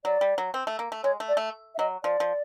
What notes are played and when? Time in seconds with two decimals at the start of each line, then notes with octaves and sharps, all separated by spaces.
0.05 F#3 D5
0.21 G3
0.38 F#3
0.54 C4
0.67 A3
0.79 A#3
0.92 A3
1.04 G#3 C#5
1.20 A3
1.29 D5
1.37 A3
1.75 E5
1.79 F#3 D#5
2.04 F3 D5
2.20 F3